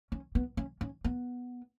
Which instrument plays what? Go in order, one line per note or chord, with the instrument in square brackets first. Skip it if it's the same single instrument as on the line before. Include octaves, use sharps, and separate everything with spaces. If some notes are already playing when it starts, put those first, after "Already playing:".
[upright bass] C#4
B3
C#4
C#4
B3